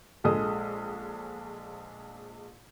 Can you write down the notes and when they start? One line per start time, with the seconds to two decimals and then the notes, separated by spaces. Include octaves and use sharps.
0.24 A#1 G#3 A4 D#6